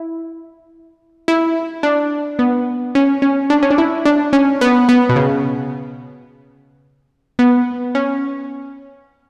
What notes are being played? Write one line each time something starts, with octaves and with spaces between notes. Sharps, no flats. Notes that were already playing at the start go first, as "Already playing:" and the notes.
Already playing: E4
E4
D4
B3
C#4
C#4
D4
C#4
D4
E4
D4
C#4
B3
B3
B2
C#3
B3
C#4